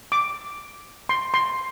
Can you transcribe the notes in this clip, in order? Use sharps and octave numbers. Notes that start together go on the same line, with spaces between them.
D6
C6
C6